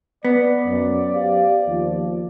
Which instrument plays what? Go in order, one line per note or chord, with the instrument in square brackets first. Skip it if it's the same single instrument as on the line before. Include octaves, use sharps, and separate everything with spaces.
[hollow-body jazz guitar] B3 [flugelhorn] D5
[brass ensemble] F#2
G4 C5 F5
D#2 F3